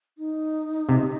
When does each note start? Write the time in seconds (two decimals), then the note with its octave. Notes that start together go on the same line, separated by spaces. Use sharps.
0.18 D#4
0.89 C3